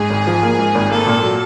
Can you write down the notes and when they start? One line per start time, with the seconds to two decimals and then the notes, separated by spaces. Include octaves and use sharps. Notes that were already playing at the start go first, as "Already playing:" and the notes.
Already playing: G#2 G#4
0.10 G#1
0.27 F3
0.43 A#3
0.59 G#2
0.75 G#1
0.91 A#3 A4
1.06 A#2
1.22 F#3